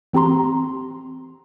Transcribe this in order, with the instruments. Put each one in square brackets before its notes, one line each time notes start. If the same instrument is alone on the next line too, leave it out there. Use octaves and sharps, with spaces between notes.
[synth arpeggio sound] E3 C4 G4 A#5 C6